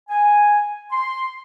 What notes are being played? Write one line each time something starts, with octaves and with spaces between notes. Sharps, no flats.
G#5
C6